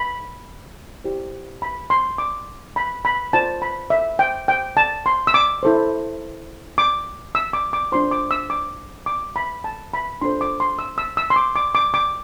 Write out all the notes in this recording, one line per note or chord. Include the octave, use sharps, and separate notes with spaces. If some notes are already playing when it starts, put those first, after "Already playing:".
Already playing: B5
E4 G4 C5
B5
C6
D6
B5
B5
F4 C5 A5
B5
E5
G5
G5
A5
C6
E6
D6
E4 A4 C5
D6
E6
D6
D6
D4 F4 C5 C6
D6
E6
D6
D6
B5
A5
B5
D4 F4 A4 C5 C6
D6
C6
E6
E6
E6
C6
D6
D6
D6
D6